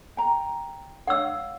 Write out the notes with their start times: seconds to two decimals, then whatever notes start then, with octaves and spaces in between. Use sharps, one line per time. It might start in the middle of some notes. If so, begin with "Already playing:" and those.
0.17 G5 A#5
1.07 C#5 F5 F#5 E6